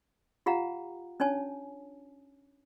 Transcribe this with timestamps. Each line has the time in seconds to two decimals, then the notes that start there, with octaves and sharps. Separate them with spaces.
0.46 F4 G4 F5 F#5 A#5
1.20 C#4 D4 C#5 G#5 A5